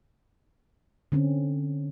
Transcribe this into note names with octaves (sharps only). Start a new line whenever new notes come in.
D3 C4 C#4